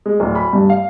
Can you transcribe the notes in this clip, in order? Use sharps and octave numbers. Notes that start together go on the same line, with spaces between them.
G#3
D1
B5
G2
F5